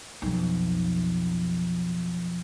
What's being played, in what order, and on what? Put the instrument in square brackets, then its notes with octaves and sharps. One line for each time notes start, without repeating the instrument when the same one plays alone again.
[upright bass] B1 F2